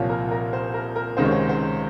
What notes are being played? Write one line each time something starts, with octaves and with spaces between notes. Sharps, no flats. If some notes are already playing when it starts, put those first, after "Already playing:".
Already playing: C2 A#2 F3 A#3 C#5
A#4
A#4
C5
A#4
A#4
C#2 C3 D#3 G#3 C5
C#5
C5
C5